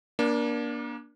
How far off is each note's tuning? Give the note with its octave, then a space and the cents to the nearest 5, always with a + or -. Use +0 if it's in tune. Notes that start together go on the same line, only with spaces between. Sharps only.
A#3 +30 D4 -10